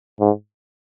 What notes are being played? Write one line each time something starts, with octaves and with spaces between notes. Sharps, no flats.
G#2